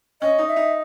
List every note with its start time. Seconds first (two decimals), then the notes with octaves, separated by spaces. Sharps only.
0.21 C#4 D#5
0.38 D#4
0.48 E5
0.56 D#4